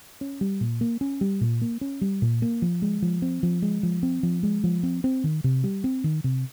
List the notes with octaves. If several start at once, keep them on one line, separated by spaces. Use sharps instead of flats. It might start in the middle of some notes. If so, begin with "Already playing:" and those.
C#4
G3
A#2
A#3
C#4
G3
A#2
A#3
C#4
G3
A#2
A#3
F3
G#3
F3
C4
F3
G#3
F3
C4
F3
G#3
F3
C4
C4
D#3
C3
G3
C4
D#3
C3